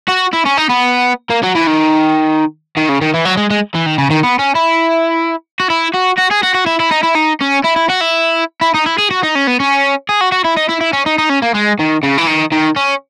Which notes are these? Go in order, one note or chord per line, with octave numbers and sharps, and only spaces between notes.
F#4
E4
C#4
D#4
B3
A#3
F#3
E3
D#3
D#3
C#3
D#3
E3
F#3
G#3
G#3
E3
D#3
C#3
D#3
B3
C#4
E4
F#4
E4
F#4
F#4
G#4
F#4
F#4
E4
E4
D#4
E4
D#4
C#4
E4
E4
F#4
E4
E4
D#4
E4
G#4
F#4
D#4
C#4
B3
C#4
G#4
F#4
F#4
E4
D#4
E4
E4
C#4
D#4
D#4
C#4
A#3
G#3
D#3
C#3
E3
D#3
D#3
C#4